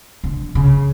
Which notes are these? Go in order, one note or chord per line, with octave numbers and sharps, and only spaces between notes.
D3
C#3